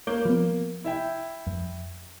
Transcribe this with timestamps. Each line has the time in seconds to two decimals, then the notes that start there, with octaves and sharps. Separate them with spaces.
0.07 A#3 C#5 D6 G6
0.25 F3 B3
0.84 E4 E5 G5
1.47 F2